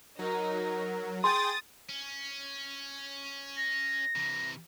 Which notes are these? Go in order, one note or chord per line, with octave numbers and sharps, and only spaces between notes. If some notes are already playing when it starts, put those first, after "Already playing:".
F#3 D#4 A#4
G#4 G5 C6 D#6 A6
C#4
A#6
C3 E3